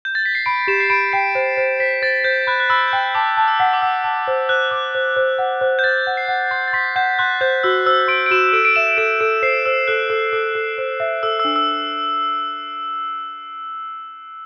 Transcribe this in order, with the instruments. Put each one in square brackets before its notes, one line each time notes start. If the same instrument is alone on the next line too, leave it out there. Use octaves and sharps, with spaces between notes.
[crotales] G6
A6
B6
C7
[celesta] B5 [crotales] D7
[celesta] G4 [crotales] E7
[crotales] C7
[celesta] B5 [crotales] D7
[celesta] G5 [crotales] C7
[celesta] C5
C5
[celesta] C5 [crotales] B6
[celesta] C5 [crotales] A6
[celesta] C5 [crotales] G6
[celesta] B5 [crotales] F#6
[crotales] F#6
[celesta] B5 [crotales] E6
[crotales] G6
[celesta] G5 [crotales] F#6
[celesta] A5 [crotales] D6
[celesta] A5
[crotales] E6
[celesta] F#5
[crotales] D6
[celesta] F#5 [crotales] E6
[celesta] A5
C5
[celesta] C5 [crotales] F#6
[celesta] D6
C5
C5
F#5
C5
[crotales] G6
[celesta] C5 [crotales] A6
[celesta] F#5
[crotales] C7
[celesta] F#5
[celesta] C6 [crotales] A6
[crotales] A6
[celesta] C6 [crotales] B6
[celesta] F#5 [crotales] G6
[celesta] C6 [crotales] F#6
[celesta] C5 [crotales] G6
[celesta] F#4 [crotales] E6
[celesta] C5 [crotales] E6
[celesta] C6 [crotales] D7
[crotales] D7
[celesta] F#4 [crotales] E7
[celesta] A4 [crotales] D7
[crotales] D7
[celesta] E5 [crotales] E7
[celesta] A4 [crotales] D7
[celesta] A4 [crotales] D7
[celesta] C5 [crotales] C7
[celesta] C5 [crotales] E6
[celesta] A4 [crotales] F#6
[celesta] A4
A4
A4
C5
E5
[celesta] A4 [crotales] E6
[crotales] E6
[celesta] D4
[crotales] E6